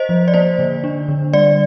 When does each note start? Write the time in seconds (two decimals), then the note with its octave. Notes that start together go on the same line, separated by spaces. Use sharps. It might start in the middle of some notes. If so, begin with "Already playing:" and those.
Already playing: C5 D#5
0.09 F3
0.28 D5
0.34 A#3 C5
0.59 D3
0.84 D4
1.09 D3
1.33 G3 D5